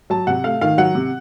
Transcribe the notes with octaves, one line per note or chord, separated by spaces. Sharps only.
F#3 A5
C3 F#5
A3 F5
D#3 F5
F#3 F#5
C3